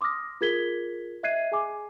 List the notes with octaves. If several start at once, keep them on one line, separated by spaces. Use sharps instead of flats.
C6 D6 D#6 F6 A#6
F4 G#4 A#4 G#6 B6 G7
D#5 E5 F#6 G#6 C7 D#7
G#4 G#5 D6